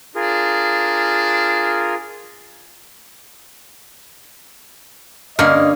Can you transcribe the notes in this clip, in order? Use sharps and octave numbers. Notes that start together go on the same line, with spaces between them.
D4 F4 G#4 A#4
G2 D3 A#3 C#4 D#5 F6